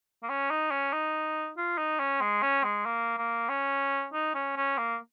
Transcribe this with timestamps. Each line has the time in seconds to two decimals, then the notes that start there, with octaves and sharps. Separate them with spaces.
0.23 A#3
0.29 C#4
0.51 D#4
0.71 C#4
0.93 D#4
1.58 F4
1.78 D#4
2.00 C#4
2.21 G#3
2.42 C#4
2.64 G#3
2.86 A#3
3.18 A#3
3.49 C#4
4.13 D#4
4.35 C#4
4.56 C#4
4.78 A#3